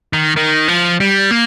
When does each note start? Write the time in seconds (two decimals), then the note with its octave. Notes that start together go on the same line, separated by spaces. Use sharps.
0.13 D#3
0.37 D#3
0.68 F3
1.00 G3
1.31 A#3